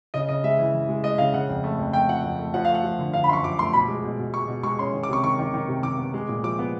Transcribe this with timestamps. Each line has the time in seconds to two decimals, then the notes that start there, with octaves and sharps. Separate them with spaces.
0.14 C#3 D#5
0.29 C#3 D#5
0.44 G#3 E5
0.59 E3
0.74 E3
0.89 G#3
1.03 G#3 D#5
1.18 C#3 F5
1.34 C#3 F#5
1.49 F2
1.64 A3
1.79 F2
1.93 A3 G5
2.09 F3 F#5
2.24 F2
2.39 A3
2.54 F3 F#5
2.65 A3 F5
2.74 F#5
2.84 F3
2.99 D3
3.13 D3 F5
3.24 B5
3.29 F#2 C6
3.33 C#6
3.44 F3 D6
3.59 A3 C6
3.73 B2 B5
3.88 G#3
4.04 B2
4.19 B2
4.34 G#3 C#6
4.48 B2
4.63 G#3 C#6
4.79 C#4 C6
4.93 D#3
5.03 D6
5.09 C3 C#6
5.24 D#3 C#6
5.39 D#3
5.54 D#3
5.68 C3
5.83 D#3 D6
5.98 B3
6.14 G#3
6.28 A#2
6.44 F3 D6
6.59 B3